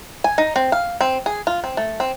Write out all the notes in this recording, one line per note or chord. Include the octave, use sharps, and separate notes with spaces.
G#5
D#4
C4
F5
C4
G#4
F4
C4
A3
C4